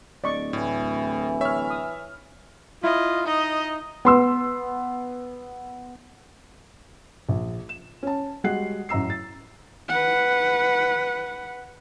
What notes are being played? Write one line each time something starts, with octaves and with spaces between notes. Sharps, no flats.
D1 D5 D#5 C#6
A2 E3
C#5 E5 F6
D#6
E4 F4 D#5
D#4 D#5
B3 C6 E6
A#1
E7
C#4 A5
G3 G#3 F#4 F#5 F#6 C7
A1 F#2 A#5 E6 C7
A6
B4 F#5